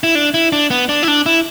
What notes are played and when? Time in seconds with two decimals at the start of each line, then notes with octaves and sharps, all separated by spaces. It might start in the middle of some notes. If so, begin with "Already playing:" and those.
0.03 E4
0.15 D4
0.34 E4
0.53 D4
0.70 B3
0.89 D4
1.03 E4
1.08 D4
1.26 E4